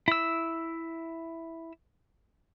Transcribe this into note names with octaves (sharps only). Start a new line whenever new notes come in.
E4 E6